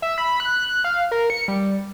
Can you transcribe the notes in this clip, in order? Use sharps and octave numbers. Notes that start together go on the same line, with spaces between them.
E5
B5
F#6
F5
A#4
C#7
G3